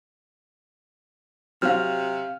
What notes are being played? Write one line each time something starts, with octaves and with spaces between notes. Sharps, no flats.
C3 F#3 C4 F5 F6